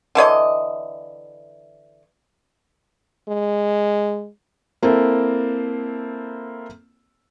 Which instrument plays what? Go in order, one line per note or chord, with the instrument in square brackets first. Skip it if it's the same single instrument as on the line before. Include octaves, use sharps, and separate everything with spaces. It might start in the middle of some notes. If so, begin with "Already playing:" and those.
[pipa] D3 E3 C#5 D#5
[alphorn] G#3
[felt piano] A#3 C4 E4 A4